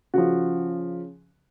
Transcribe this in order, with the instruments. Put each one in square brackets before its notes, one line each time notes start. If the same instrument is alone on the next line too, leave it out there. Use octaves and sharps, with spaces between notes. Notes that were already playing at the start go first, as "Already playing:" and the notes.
[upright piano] C#3 F3 F#4